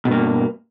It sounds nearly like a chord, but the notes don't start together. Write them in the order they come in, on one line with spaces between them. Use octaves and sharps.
B2 G2 A#3